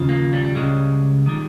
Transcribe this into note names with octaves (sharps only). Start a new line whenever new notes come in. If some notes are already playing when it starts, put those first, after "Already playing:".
Already playing: D#2 C#3 F3
A#3
G3
G3
C#2 C#3 G3 G#3
D#3 G3